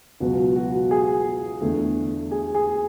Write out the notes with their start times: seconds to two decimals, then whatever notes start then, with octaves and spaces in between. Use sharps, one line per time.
0.20 C#2 B2 F#3 B3 F#4
0.56 F#4
0.91 G#4
1.61 E2 D3 A3
2.31 G#4
2.55 G#4